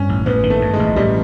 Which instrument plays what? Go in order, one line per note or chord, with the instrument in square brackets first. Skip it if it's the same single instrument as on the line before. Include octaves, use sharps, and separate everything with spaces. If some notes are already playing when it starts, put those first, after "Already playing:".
Already playing: [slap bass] G2 [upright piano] C#4
[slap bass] A1
[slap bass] A1 [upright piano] B3
[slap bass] D#3
[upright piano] A3
[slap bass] G2
[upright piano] G#3
[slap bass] A1
[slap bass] A1 [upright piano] G3